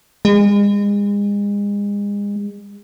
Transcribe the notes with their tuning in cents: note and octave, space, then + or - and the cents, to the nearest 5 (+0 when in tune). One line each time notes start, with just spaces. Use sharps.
G#3 -35